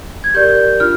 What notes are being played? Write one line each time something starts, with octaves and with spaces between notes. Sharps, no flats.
G#6
G4 A#4 D5 G6
D4 F4 F6